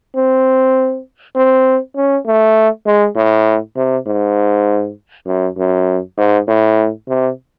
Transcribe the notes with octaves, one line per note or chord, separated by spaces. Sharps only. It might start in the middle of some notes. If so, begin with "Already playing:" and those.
C4
C4
C#4
A3
G#3
A2
C3
G#2
F#2
F#2
G#2
A2
C3